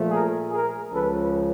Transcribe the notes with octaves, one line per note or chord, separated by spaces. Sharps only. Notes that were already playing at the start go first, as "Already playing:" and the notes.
Already playing: A#2 F3 A3
G#4 A#4
G#4 A#4
C#2 C#3 F3 A4 B4